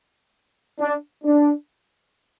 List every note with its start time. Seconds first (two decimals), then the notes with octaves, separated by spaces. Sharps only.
0.80 D4
1.24 D4